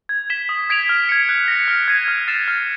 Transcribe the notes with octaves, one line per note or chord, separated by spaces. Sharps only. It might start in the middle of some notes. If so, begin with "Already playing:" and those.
G#6
B6 E7 G7
D#6
G#6 B6 D7 F7
F6
G#6 C#7
F#6
A#6 C#7
F6
G#6 C7 D#7
F6
A6 C7 E7
F6